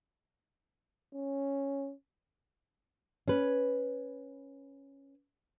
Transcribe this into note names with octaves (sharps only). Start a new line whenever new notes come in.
C#4
C#4 B4